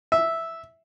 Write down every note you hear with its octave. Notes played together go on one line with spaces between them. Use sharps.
E5